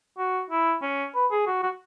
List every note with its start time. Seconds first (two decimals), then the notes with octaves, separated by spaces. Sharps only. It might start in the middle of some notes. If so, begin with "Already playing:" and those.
0.18 F#4
0.51 E4
0.82 C#4
1.15 B4
1.31 G#4
1.47 F#4
1.63 F#4